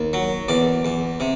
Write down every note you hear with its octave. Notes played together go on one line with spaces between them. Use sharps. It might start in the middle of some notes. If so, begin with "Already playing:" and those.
Already playing: D#2
F#3
E2 D5
E2
C3